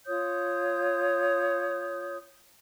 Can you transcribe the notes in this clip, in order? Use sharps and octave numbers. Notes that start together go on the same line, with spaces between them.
F4 C#5 D#6 G6